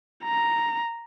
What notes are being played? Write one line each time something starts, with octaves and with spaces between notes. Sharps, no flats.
A#5